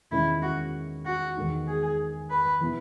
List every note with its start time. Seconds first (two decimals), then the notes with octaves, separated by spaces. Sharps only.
0.11 E2 D#3 G#3 C#4 E4
0.42 F#4
1.05 F#4
1.36 E2 D#3 G#3 D#4
1.68 G#4
2.30 B4
2.61 E3 B3 E4